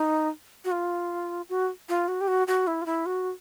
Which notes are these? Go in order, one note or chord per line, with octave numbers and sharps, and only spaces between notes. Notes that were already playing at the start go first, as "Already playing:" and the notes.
Already playing: D#4
F#4
F4
F#4
F4
F#4
G4
F#4
F#4
E4
F4
E4
F#4